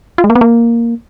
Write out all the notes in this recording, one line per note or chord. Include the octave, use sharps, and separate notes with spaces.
F4
G#3
A#3
B3
A#3